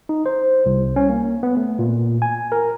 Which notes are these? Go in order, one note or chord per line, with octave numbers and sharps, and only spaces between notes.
D#4
C5
C2
C#4
A#3
B3
A3
A#2
G#5
A#4